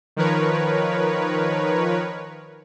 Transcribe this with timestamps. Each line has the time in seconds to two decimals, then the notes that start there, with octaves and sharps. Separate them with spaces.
0.17 D#3 F3 A#4 B4 C#5